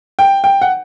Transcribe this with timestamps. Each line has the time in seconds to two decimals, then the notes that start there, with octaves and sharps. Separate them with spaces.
0.19 G5
0.44 G5
0.61 F#5